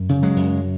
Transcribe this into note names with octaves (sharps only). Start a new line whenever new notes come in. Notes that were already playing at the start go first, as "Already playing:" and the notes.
Already playing: F#2
C#3
F#3 G#3
F#2